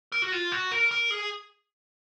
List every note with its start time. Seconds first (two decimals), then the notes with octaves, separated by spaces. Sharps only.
0.12 A#4
0.22 F#4
0.32 F4
0.52 F#4
0.71 A#4
0.91 A#4
1.11 G#4